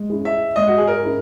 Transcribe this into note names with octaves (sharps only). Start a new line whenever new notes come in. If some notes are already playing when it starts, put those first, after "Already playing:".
Already playing: G#3
C#4 E4 G#4
E5
G#3 D#5
F#4
G#4
A#4
C#4 E4 G#4